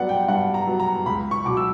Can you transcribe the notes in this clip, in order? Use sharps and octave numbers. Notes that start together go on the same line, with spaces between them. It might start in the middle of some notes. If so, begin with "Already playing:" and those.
Already playing: G2 F#3 B3 D5 F#5
G5
G2 F#5
A#5
F#3 B3
A#5
C#2 B5
C#6
B2 F#3 D6
E6